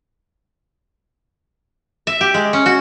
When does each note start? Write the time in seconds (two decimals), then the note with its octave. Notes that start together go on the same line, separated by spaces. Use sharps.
2.07 E5
2.21 G4
2.34 G#3
2.53 C#4
2.66 F#4